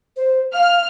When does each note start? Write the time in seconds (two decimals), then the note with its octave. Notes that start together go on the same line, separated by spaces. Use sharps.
0.16 C5
0.54 F5 F6